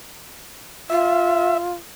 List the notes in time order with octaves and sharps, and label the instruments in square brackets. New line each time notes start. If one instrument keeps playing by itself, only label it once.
[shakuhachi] F4 [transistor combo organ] E5